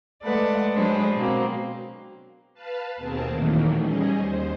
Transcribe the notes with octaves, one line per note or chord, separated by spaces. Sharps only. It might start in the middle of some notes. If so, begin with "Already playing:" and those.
G#3 A3 A4 B4 D5 F#5
F#3 G#3 D4 G#4 B4 C5
B2 F#3 A#3 C4
B4 F5 A5
D#2 B2 C4 G#4 A#4 A5
A#2 D#3 E3 F#3 A3 A#3
G3 C#4 G#4 D#5
D#2 C5